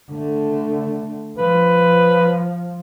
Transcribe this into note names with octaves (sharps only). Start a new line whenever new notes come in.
D3 A3
F3 B4